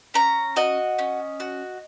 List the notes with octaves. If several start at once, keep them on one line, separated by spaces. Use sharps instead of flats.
C#4 A#5
F#4 D#5
C#4
F#4